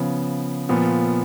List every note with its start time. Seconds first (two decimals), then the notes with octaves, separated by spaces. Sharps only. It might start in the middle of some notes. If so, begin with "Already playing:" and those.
Already playing: C#3 F3 B3
0.69 A#2 F3 B3